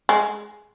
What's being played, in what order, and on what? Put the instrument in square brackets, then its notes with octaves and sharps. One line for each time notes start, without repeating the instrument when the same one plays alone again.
[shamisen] G#3